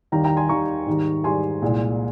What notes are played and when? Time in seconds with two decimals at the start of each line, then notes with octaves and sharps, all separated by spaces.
0.12 D#2 D#3 G3 G5 A#5
0.24 G5 A#5
0.37 G#5 C6
0.49 D#2 D#3 G3 A#5 C#6
0.86 G#2 D#3 G3
1.24 G#2 D#3 G3 G#5 C6
1.62 C2 A#2 G#3